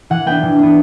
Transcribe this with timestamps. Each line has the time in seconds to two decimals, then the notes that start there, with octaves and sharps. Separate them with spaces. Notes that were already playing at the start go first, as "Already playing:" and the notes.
0.10 E3 F#5
0.26 B3 D4 G5
0.43 E3
0.59 B3 D4